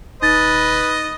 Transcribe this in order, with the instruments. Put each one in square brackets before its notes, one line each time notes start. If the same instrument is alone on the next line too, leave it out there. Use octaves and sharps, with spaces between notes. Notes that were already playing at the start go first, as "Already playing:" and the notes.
[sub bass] D#1 [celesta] D#4 A6 [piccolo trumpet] B4 [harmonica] D#5